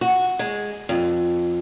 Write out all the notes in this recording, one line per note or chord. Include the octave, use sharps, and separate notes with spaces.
F#4
G#3
F2